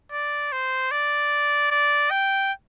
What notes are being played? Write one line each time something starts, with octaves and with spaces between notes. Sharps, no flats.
D5
C5
D5
D5
G5